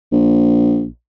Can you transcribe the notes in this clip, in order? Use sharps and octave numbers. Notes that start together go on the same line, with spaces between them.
A#1